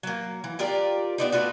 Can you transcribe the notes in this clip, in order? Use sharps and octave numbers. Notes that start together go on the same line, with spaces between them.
F#3 A#3
E3
F4 G4 A#4 D5
B3 D4 D#4
A3 B3 F4 F#4